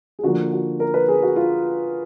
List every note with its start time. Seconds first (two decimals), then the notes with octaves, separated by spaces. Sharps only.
0.19 G#4
0.23 D3 F3 A#3 F#4
0.52 F#4
0.80 A#4
0.94 B4
1.08 G#4
1.23 F#4
1.36 F4